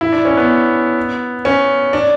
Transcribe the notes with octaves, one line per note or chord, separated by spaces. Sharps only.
E4
D4
C#4
B3
C#4
D4